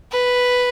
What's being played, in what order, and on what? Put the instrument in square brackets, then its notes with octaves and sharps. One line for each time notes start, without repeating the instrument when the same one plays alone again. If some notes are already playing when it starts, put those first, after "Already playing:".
[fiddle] B4